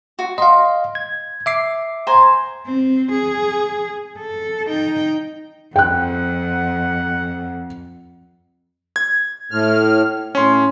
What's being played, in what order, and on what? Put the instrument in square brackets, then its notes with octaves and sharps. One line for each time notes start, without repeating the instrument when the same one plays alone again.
[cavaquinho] F#4
[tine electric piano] D#5 F5 [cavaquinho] C6
[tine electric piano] G#6
E5 D6 C7
[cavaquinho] C5 G#5 A#5
[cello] C4
G#4
A4
D#4 G5
[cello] F2 [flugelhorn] F#5 [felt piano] G5 F#6
[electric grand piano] G#6
[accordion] A2 F6
[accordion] A2 [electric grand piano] C#4 C6